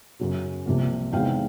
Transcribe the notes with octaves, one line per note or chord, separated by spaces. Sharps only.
F#2 C#3 F#3
C2 C3 F3 A#3
E2 C3 D#3 G#3 F5 G5